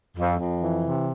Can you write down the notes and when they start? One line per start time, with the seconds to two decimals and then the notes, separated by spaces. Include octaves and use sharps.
0.17 F2
0.40 F2
0.61 E3
0.83 C3